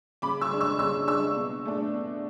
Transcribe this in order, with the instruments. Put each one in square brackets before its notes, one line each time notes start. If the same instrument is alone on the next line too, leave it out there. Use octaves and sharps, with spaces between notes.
[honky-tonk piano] C#3 B5 D6
C#6 E6
G#3 D4
C#6 E6
C#3 C#6 E6
G#3 D4 C#6 E6
B2
A3 D4
B2